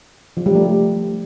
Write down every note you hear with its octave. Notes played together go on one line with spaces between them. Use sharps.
F3
G3
A3